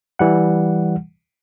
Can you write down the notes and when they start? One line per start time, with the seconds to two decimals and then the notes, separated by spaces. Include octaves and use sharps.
0.19 E3 G3 F#5